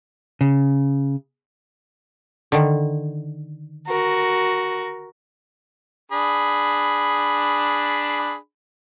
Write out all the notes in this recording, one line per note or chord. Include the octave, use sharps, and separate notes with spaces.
C#3
D3 D#3
F#4 A#4
D4 G#4 B5